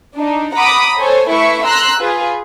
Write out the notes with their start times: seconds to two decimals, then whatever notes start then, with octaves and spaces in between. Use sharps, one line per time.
0.17 D4 D#4
0.55 F#5 A#5 B5 D6 D#6
0.99 A4 C5 C#5 G#5
1.30 A3 E4 B4 E5 C#6
1.64 A#5 C6 E6 F#6
1.99 F4 G#4 B4